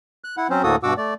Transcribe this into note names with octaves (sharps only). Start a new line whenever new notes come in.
F#6
E4 F#5
F#3 C4 C#4 C5
D2 A2 A#3 F#4 A4 D#6
G2 B2 F#4 F#5 D6 E6
A3 D5